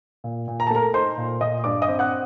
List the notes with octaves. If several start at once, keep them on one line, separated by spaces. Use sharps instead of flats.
A#2
A#2
A#5
A5
A3 A#4 A#5
D#4 C5 C6
A#2
A#2 D#5 D#6
G2 D5 D6
D#5 D#6
C4
F#5 F#6